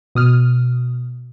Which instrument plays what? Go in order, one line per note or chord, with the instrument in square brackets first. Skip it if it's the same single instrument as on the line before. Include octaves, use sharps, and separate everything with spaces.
[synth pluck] B2 D#6 F6